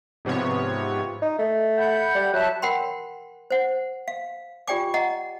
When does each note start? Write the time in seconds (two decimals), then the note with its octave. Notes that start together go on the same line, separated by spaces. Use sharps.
0.25 G#2 C3 F3 B3 C#5
1.22 D#4
1.39 A3
1.77 F#5 B5 G6
2.15 G3
2.33 F#3 E5 A5 F#6
2.62 A#4 F#5 G5 B5 C6
3.51 C5 F#5
4.08 F5
4.68 F4 G4 D5 G5 G#5 D6
4.94 D#5 F#5 A#5